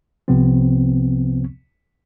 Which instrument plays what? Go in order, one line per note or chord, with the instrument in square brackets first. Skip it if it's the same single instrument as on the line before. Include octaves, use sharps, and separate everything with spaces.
[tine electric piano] C2 C3 F3 B3 C4